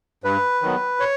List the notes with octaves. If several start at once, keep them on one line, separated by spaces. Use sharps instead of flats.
G2 B4
D#3 F#3 B3
C#5